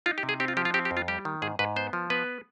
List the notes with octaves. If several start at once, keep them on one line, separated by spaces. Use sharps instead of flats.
D#4 F4
G4
C3
G#4
C4 G4
F4
F3 G4
F4
C4 G4
G4
F2
F4
G3 G4
D#3
G#2 G#4
G#2 B4
B3 C5
F3
B3 B4